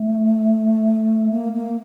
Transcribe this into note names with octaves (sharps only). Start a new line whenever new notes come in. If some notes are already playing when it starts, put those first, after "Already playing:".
Already playing: A3
A#3
A#3